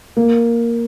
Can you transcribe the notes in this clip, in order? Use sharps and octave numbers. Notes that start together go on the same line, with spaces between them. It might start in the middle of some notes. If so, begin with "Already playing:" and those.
A#3